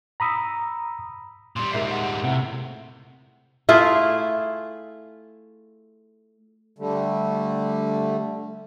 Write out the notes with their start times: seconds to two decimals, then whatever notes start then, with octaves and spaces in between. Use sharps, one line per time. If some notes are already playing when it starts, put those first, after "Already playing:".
0.20 A#5 B5 D#6 E6
1.56 A#2 G3 C6
1.73 G#2 A#4 E5 C7
1.91 F#5
2.24 A2 C3
3.69 A3 E4 F4 G#4
6.79 D3 G3 A3